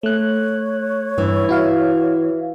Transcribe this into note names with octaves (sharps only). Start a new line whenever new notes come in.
A3 C#5 F#6
G2 E3
E4 F#4 F5